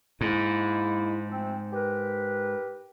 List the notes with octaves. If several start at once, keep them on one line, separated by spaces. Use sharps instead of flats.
G#2 G#3 A#3 E4
F3 A3 C4
G4 A#4 B4